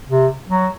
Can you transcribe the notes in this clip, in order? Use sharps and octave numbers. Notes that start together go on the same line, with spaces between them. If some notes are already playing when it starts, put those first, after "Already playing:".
C3
F#3